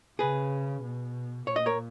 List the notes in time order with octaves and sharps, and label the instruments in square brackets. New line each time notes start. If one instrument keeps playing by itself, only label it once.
[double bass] C#3 [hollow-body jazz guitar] G#4 B4
[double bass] B2
[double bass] A#2 [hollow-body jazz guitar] C#5
[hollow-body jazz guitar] D#5
A#4 C#5